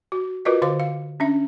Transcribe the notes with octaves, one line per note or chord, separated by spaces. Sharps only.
F#4
F4 F#4 A#4 B4 D5 D#5
D3 C5 F5 D6
F5
C#4 D4 E5